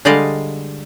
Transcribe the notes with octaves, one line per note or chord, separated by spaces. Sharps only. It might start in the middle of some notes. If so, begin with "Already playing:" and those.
D3 G3 G#3 D5 D#5 F5